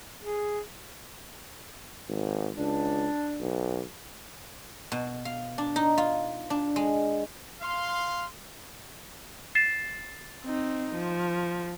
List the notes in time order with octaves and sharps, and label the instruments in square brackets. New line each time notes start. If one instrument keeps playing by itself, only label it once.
[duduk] G#4
[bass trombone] G#1
[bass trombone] C#2 [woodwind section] D4
[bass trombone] B1
[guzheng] B2
F5
D4
D#4
F4
D4
G#3
[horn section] F5 C6
[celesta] A6 C7 E7
[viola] C4 D#4
F3